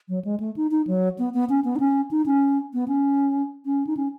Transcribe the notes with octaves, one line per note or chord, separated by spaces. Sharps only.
F#3
G#3
A3
D#4
D#4
F#3
B3
B3
C#4
B3
D#4
C#4
D#4
C#4
B3
C#4
C#4
D#4
C#4